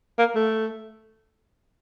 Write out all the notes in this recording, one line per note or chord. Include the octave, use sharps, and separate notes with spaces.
A#3
A3